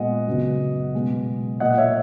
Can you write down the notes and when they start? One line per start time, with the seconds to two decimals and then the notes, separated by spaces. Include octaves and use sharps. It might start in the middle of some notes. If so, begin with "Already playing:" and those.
Already playing: A#2 G#3 B3 D#5 F#5
0.27 F#2 C#3 F#3 B3
0.94 B2 G#3 B3
1.60 A#2 A#3 D#5 F#5
1.70 F#5
1.78 C#5 E5